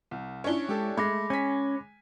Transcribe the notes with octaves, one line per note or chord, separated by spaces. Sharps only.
C2
C#4 D4 E4 C#5 G7
G#3 G4 A4
G#3 A3 B5 D6 A#6
C#4 G#5 B6